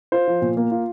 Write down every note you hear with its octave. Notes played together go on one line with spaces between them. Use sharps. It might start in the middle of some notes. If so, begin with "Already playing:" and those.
F4 C5
F3
A#2
A#3
F4